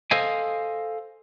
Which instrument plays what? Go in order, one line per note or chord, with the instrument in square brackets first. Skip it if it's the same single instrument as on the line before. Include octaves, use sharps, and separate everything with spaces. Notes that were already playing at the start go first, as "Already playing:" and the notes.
[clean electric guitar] A4 C5 D#5 F5 G#5